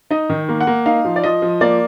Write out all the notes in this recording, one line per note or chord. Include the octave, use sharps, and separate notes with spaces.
D#4 D#5
D#3
A#3
F#5
A#3
D#4 F5
F3
D5
F3 D#5
F3
A#3 D5